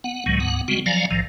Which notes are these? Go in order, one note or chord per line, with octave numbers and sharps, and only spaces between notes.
B3 F#5
C#2 A2 D#3 F#3 G#3
D2 G#2 B3 F#5
C#3 G3 G#3 B3 C4 F#4
F3 F#3 D5 F5 G#5 A#5
A#1 A2 D#3 F3